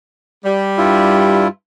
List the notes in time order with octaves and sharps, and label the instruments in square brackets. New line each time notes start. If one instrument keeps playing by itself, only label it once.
[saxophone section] G3
[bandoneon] G2 E4 F4